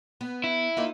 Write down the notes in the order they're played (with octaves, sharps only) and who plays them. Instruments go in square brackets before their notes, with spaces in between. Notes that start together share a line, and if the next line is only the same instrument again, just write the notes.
[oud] B3
[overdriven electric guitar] E4
[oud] A#3 D#4 F4